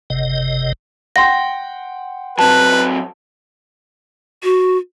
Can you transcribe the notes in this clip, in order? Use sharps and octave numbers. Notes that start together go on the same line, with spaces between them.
F#1 C3 D#5
F#5 G5 C6 A#6
F#3 C4 B4 A5
F#4